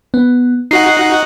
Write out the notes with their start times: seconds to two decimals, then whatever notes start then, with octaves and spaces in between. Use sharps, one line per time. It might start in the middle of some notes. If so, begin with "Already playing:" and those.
0.14 B3
0.71 D#4 F#4 F#5 C7